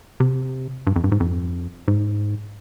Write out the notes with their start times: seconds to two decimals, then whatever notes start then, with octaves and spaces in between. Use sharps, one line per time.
0.20 C3
0.87 G2
0.96 F2
1.04 G2
1.12 G#2
1.20 F2
1.88 G#2